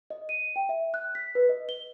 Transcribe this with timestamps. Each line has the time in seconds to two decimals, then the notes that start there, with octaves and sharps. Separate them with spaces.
0.10 D#5
0.29 D#7
0.56 G5
0.69 E5
0.94 F#6
1.15 B6
1.35 B4
1.49 D#5
1.69 G7